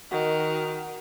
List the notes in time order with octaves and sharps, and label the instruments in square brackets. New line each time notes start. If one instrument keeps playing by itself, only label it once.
[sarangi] D#3 [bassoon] F#4